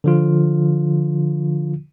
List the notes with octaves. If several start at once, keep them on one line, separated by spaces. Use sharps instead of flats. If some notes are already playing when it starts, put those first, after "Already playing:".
D3 F3 F4